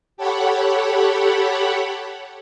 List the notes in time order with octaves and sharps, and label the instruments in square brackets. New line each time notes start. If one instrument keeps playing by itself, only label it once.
[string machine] G4 A4 C#5 F#5 B5